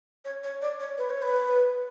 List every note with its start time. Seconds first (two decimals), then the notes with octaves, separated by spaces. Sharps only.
0.25 C#5
0.44 C#5
0.62 D5
0.80 C#5
0.98 B4
1.10 C#5
1.22 B4